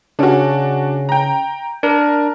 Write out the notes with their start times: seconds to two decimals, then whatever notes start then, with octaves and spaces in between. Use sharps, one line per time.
0.19 C#3 C#4 D4 F#4
1.09 G5 A#5
1.83 D4 A#4